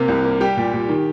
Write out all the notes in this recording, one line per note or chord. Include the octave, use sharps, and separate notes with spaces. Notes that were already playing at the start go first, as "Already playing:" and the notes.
Already playing: C3 A#3 G4
C2
A#3
G3 G4
A#2
A#2
D#3